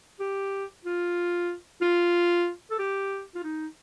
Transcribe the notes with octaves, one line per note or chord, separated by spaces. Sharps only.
G4
F4
F4
A4
G4
F4
D#4